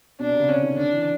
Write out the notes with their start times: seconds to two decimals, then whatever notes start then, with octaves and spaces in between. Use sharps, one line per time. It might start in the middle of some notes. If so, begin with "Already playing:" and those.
0.19 B2 D4
0.29 C3
0.40 C#3
0.49 D3 C#4
0.63 D#3
0.78 D3 D4
0.92 E3